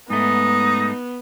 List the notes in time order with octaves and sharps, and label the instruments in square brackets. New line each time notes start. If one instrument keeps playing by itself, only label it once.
[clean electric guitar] G#2 A3 [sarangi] B3 [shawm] D#4